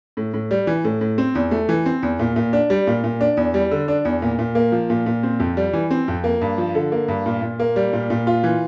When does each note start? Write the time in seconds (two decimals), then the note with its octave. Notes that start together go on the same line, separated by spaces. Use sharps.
0.17 A2
0.34 A2
0.51 G3
0.67 E3
0.84 A2
1.01 A2
1.18 C4
1.35 E2
1.51 A3
1.69 E3
1.86 C4
2.03 E2
2.19 A#2
2.36 A#2
2.53 D4
2.70 G3
2.87 A#2
3.04 A#2
3.21 D4
3.37 E2
3.54 G3
3.71 D3
3.88 D4
4.05 E2
4.22 A#2
4.39 A#2
4.55 A#3
4.72 F3
4.90 A#2
5.06 A#2
5.23 C4
5.40 F2
5.57 G3
5.73 E3
5.91 C4
6.08 F2
6.24 A#3
6.41 G2
6.58 F3
6.75 D3
6.92 A#3
7.08 G2
7.26 A#2
7.42 A#2
7.60 A#3
7.76 G3
7.93 A#2
8.10 A#2
8.27 F4
8.44 E3